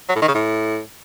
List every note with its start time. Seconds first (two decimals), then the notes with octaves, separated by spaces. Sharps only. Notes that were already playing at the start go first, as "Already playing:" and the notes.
0.09 F#3
0.15 A2
0.22 D#3
0.28 C#3
0.35 A2